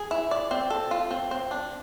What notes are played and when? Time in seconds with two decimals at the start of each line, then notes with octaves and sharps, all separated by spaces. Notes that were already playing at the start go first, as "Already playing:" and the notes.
Already playing: G#4
0.11 E4
0.31 D5
0.51 C4
0.70 A4
0.91 F4
1.11 C4
1.31 C4
1.51 D4